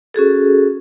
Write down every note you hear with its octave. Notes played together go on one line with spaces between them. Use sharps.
C#4 F#4 G#4 A4